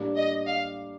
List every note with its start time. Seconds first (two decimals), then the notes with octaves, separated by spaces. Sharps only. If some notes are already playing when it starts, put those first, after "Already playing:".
Already playing: A2 G3 A#3 D4
0.17 D#5
0.47 F5